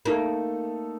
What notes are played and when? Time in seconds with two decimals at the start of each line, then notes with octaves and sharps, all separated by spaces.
0.05 A3 A#3 D#4 A4